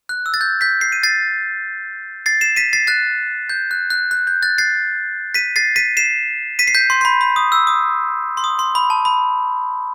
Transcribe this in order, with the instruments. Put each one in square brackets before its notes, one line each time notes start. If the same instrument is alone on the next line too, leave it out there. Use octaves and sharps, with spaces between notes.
[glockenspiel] F#6
E6
A6
G6
G6 B6
C7
D#7
A6 C7
A6 C7
C7 E7
B6 D#7
A6 C7
F#6 A6
G6
F#6
F#6
F#6
G6
F#6 A6
A6 C7
B6 D#7
A6 C7
B6 D#7
C7 E7
B6 D#7
C7
G6 B6
C6
C6
B5
B5
D#6
E6
D#6
C6
D#6
C6
B5
A5
B5